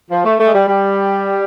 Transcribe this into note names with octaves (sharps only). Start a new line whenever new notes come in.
F3
A3
A3
G#3
G3
G3